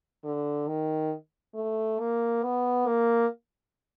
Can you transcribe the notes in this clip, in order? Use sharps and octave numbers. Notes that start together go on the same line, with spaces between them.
D3
D#3
A3
A#3
B3
A#3